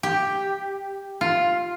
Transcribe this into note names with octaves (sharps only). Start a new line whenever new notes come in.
G4
F4